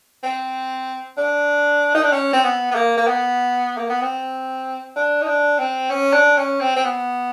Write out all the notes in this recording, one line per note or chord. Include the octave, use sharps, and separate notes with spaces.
C4
D4
D#4
D4
C#4
C4
B3
B3
A#3
A#3
B3
A#3
B3
C4
D4
D#4
D4
C4
C#4
D4
C#4
C4
C4
B3